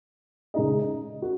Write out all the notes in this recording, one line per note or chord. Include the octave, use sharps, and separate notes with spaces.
C#3 G#3 D#4 G#4 D#5
F#4